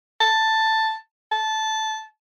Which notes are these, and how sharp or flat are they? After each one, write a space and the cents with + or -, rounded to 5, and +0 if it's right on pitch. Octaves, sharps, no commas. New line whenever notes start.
A5 +5
A5 -10